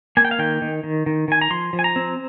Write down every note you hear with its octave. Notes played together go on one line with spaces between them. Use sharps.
A#3 G#5
G5
F5
D#3 G5
D#3
D#3
D#3
D#3 G#5
A#5
F3 C6
F3
G#5
A#5
C4